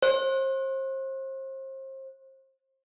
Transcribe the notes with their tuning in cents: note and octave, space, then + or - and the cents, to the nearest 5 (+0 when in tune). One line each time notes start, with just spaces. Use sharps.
C5 +35